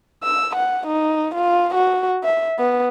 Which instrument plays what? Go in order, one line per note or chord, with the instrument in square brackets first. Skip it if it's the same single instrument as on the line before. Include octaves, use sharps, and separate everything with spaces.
[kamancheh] E6
F#5
D#4
F4
F#4
E5
B3